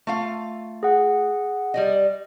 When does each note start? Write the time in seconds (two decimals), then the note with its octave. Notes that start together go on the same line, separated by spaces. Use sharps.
0.07 A3 F4 F5
0.83 G#4 F#5
1.74 G3 D5 D#5